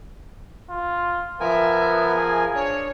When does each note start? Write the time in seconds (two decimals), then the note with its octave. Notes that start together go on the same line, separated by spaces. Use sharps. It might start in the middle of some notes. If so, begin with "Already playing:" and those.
0.70 F4
1.40 F3 B3 A#4 E5 G#5
2.15 G#4
2.55 D4 C#5